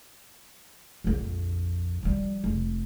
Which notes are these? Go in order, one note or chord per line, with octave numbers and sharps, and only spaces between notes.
A#1 F2
F3 G3
F1